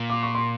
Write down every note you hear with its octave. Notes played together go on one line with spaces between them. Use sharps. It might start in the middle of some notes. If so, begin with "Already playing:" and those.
Already playing: A#2
D6
C#6
C6